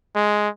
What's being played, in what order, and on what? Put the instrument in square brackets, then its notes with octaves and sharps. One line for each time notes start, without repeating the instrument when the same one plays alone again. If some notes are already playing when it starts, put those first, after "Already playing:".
[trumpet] G#3